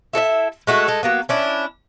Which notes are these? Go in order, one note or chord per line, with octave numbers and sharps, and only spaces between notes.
E4 A4 D5 E5
G#3 A3 F#4
G#3 A4
F#3 A#3 B3
C#4 D4 E4